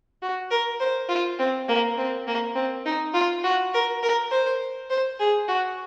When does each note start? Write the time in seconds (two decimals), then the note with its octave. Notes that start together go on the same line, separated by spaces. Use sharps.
0.22 F#4
0.51 A#4
0.80 C5
1.09 F4
1.39 C4
1.68 A#3
1.97 C4
2.27 A#3
2.55 C4
2.86 D#4
3.14 F4
3.43 F#4
3.73 A#4
4.03 A#4
4.31 C5
4.90 C5
5.20 G#4
5.48 F#4